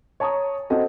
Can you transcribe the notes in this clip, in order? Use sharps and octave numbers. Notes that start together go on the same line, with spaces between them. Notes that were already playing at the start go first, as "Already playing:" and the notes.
C#5 A5 A#5 C#6 D#6
C4 F#4 A4 D#5